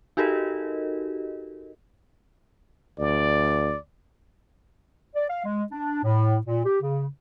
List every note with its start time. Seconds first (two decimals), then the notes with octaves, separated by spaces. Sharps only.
0.17 D#4 F#4 G4 A4 A#4 D#5
2.99 D2 D5
5.15 D5
5.29 F5
5.45 G#3
5.72 D4
6.04 A2
6.46 A#2
6.65 G4
6.81 C#3